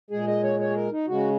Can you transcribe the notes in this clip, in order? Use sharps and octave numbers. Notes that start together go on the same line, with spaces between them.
A#2 G#3 G#4
D#5
C#5
C#5
G#4
A#4
D#4
C#3 G#3 F#4